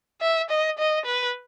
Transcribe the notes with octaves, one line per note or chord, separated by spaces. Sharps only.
E5
D#5
D#5
B4